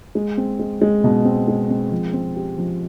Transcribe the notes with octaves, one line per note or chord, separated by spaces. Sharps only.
G#3
C4
G#3
G#3
B2
C4
G#3
C4
F3
C4
G4
F3